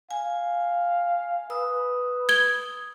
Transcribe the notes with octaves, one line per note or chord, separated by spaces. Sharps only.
F5 G#5
B4 D#6 E6
G#6 G7